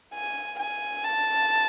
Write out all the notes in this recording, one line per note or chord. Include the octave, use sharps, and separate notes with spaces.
G#5
G#5
A5